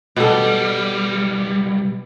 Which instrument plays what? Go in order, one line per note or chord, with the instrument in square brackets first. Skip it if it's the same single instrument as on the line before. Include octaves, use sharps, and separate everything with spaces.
[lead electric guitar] B1 G3 [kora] B2 A4